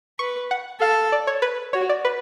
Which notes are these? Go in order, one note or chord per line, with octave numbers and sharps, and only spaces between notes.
B4 C#6
F#5
A4 F5
D5
C#5
B4
F#4 C#5
D5
B4